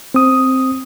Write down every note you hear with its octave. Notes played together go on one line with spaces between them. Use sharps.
C4 D#6